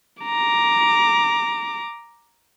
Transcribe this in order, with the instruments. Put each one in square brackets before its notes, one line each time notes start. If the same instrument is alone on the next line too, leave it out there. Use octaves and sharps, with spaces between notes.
[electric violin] A#5 D6